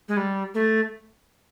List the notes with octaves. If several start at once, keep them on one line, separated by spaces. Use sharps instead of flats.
G#3
G3
A3